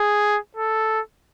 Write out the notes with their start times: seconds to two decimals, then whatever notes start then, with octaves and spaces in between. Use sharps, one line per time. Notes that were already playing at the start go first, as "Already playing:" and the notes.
Already playing: G#4
0.56 A4